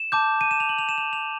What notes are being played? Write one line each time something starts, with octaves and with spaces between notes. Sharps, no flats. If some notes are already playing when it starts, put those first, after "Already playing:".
Already playing: E7
A5 D6 G6
D#7
E7
F7
F#7
F7
E7
F7
F7